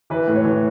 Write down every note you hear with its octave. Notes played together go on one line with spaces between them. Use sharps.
E3 B4
A2
C#5
E3